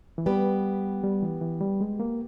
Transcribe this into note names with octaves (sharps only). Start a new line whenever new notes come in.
E3
G3 B3 G4 B4
G3
E3
E3
G3
G#3
A#3